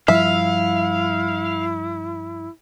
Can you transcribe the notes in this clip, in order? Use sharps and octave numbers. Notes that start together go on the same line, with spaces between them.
G2 F3 G3 E4 E5 F5